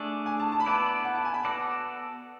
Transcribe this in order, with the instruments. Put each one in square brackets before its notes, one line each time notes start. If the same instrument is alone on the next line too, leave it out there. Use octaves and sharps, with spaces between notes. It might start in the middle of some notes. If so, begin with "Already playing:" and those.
Already playing: [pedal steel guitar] A3 D4 G#4 D5
[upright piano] G#5
A5
A5
B5
[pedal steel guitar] B3 E4 B4 D5 [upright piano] A5
[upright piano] F#5
A5
G#5
B5
[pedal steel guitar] B3 F#4 A4 D5 [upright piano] A5